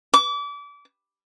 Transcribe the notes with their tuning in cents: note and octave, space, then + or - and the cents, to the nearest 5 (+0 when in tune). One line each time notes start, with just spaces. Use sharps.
D6 -30